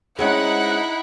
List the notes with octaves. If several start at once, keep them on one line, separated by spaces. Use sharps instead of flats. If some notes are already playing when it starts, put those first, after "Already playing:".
G#3 C4 C#4 D#4 E4 F#5 F#6